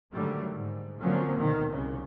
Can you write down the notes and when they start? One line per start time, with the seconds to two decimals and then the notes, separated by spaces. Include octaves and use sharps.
0.12 G#2 D3 D#3 F#3 G3 A3
0.56 G#2
1.01 D3 F3 F#3 A#3 C4 C#4
1.38 D2 B2 D#3
1.73 C2 C#3